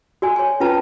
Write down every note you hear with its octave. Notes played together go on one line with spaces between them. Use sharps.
F#4 D5 G#5
C#5 G#5
C#4 F4 B4 A5 A#5